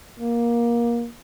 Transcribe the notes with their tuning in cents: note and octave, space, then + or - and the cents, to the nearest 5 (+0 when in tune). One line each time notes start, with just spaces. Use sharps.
A#3 +20